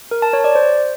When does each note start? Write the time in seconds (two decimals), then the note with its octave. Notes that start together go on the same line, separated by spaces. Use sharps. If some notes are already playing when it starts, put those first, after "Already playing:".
0.11 A#4
0.22 A5
0.33 C#5
0.44 D5
0.55 C5